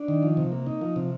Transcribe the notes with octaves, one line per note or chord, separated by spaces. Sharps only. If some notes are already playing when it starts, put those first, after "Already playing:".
Already playing: D4
D#3
F3
C3
A#3
D#4
F3
C3